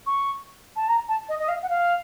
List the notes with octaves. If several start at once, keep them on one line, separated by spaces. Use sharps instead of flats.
C#6
A5
A#5
A5
D#5
D#5
F5
F#5
F5